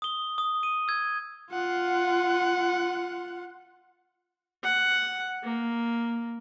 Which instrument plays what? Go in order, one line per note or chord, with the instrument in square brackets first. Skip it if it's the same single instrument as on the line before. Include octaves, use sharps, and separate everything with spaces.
[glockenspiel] D#6 G7
D#6
D#7
E6 G#6
[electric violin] F4 F#5
[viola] F#5
A#3